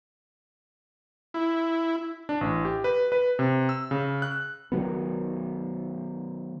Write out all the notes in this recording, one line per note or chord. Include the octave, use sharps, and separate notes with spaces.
E4
D4
A1
G4
B4
B4
C3
E6
C#3
F#6
D#3 E3 F#3 B3